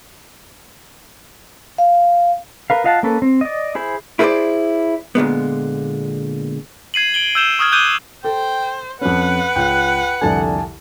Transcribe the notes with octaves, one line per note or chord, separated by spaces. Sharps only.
F5
A#4 B4 F5
F4 D#5 F5 F#5 A5
A#3 C#4 A4 B4
C4
D5 D#5
E4 G#4 C5 B5
E4 G#4 A4 B4 C5 D5
A#2 D3 G#3 B3
G#6 C7 D#7 F#7
D7 F#7 G7
E6 G6 E7 G7
C#6 D#6 F6 G#6
D6 F#6 G6 D#7 G7
A4 C5 G5
F2 C#4 B4 F#5
C#2 G5 F#6
C2 F2 D3 G#5 A5